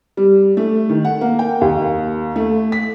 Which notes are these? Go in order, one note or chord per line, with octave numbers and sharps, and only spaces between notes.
G3
A3
D#3
F#5
A#3
G5
D#2
A3
B6